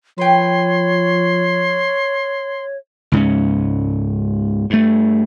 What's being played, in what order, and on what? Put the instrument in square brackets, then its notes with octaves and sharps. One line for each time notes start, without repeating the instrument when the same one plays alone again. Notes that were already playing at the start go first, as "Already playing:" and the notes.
[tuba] F3 [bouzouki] B4 G5 [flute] C#5 [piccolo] C6
[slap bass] C#2 G#2 A3 C#4
G2 A3